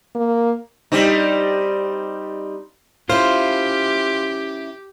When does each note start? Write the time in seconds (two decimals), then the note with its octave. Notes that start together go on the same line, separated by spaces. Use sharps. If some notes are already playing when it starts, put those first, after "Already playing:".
0.15 A#3
0.92 G3 C4 D#4
3.09 C#4 E4 F4 G4 C5